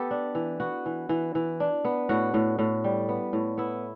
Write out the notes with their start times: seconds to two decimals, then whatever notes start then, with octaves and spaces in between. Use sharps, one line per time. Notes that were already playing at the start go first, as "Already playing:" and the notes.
Already playing: B3 G4 A4
0.11 D4
0.35 E3
0.60 B3 F#4
0.86 E3
1.09 E3
1.35 E3
1.60 D4
1.85 B3
2.09 A2 F#4
2.34 A2
2.59 A2
2.84 G3
3.09 B3
3.33 A2
3.58 B3 E4